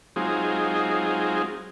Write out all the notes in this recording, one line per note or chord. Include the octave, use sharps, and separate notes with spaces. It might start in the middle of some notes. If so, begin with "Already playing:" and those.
F#3 G#3 C4 D#4 F4 G#4